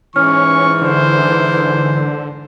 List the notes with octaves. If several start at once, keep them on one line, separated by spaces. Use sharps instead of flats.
G#2 E3 C#4 C#6 F6
D3 C5